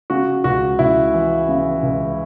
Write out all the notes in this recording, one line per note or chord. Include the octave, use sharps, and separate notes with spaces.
C#3 F#4
C#2 F#4
C#2 E4
E3
C#3
C#2